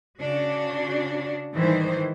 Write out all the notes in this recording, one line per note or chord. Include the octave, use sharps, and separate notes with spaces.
C#3 D4 F#4
G#2 D#3 E3 G3 G#4 C5